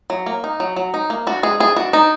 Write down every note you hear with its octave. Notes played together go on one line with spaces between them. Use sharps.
F#3
A#3
D#4
F#3
F#3
D#4
A#3
D4 F#4
G#3 G#4
D4 G#4
D4 F#4
D4 D#4